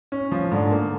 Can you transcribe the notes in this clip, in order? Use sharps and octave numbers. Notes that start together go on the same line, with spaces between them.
C#4
F3
G#2 D3
A#3